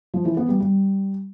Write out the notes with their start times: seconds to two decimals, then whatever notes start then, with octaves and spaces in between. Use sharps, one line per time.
0.14 F3
0.25 E3
0.37 B3
0.49 G3
0.60 G3